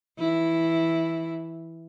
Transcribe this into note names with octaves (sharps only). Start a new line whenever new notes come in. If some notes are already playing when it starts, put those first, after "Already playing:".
E3 E4